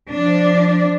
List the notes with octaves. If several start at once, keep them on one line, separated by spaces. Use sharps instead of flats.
F3 D4